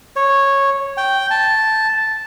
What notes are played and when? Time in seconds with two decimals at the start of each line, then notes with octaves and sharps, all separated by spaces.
0.16 C#5
0.97 G5
1.31 A5